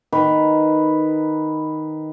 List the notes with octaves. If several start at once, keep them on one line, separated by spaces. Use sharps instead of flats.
D#3 B4